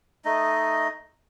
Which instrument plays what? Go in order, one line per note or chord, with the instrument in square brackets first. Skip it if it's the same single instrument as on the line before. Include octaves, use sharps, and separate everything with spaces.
[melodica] A3 D#4 D#5